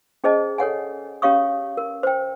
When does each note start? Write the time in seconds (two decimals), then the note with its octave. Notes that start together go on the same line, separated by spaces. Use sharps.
0.24 C#4 G#4 C5 D#5 A5
0.58 A4 C#5 F#5 G#5
1.22 C#4 G4 C#5 F5 C#6 D#6
1.77 A#4
2.03 C5 G5